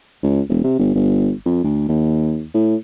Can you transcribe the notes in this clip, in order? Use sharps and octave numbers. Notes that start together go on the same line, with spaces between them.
C#2
E1
C3
G1
G1
F2
D2
D#2
A2